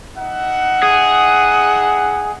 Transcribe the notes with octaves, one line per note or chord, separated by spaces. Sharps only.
D#4 E5 F#5
G#4